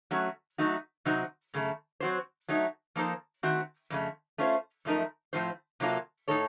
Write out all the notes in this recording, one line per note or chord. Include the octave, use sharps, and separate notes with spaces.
F#3 A3 C#4 F#4
F#3 A3 D#4 F#4
C3 F#3 C4 D#4 F#4
F#2 C#3 A3
F#3 C4 F#4 C5
F#3 A3 D#4
F3 A#3 D#4 A4 C5
D#3 A3 C4 F#4
F2 C#3 A3
A3 C#4 F4 C5
F#2 F3 A3 D#4 A#4
A2 F3 C4 F4 C5
C3 F#3 A#3 F4 A4
A2 A3 D#4 A4 C#5